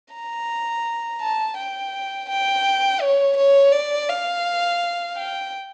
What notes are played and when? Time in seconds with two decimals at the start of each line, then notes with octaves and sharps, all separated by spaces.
0.14 A#5
1.21 A5
1.57 G5
2.29 G5
3.01 C#5
3.37 C#5
3.73 D5
4.09 F5
5.16 G5